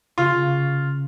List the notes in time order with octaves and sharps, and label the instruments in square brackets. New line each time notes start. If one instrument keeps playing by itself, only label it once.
[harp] C#3 [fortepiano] F4